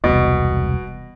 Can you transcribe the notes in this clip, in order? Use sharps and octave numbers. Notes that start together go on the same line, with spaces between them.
E1 C2 B2